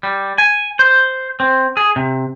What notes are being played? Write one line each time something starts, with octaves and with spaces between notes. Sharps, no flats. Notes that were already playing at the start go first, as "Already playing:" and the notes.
G3
G#5
C5
C4
G#4
C3